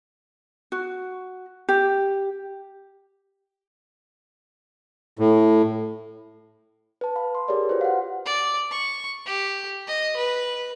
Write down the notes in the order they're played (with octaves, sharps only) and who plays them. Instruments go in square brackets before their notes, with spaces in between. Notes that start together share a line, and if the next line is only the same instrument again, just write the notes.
[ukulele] F#4
G4
[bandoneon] A2
[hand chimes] B4 A5
F5 B5
C6
G4 G#4 A#4 C#5 D5 C6
F4 F#4 B4 C5
F5 F#5
[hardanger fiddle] D5
C#6
G4
D#5
B4